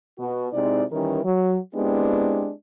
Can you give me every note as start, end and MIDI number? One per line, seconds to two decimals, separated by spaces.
0.19 0.48 47
0.19 0.48 66
0.53 0.83 48
0.53 0.83 56
0.53 0.83 60
0.53 0.83 63
0.53 0.83 64
0.53 0.83 74
0.92 1.20 51
0.92 1.20 52
0.92 1.20 55
0.92 1.20 61
0.92 1.20 70
1.25 1.57 54
1.75 2.51 56
1.75 2.51 59
1.75 2.51 60
1.75 2.51 62
1.75 2.51 64
1.75 2.51 67